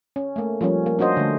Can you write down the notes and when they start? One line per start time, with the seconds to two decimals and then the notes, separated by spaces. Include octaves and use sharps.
0.16 C#4
0.36 A3 A#3
0.61 F3 G3 A#3 C#4
0.86 A#3
0.99 C#4 D4 F#4 C5 D#5
1.17 D3 A3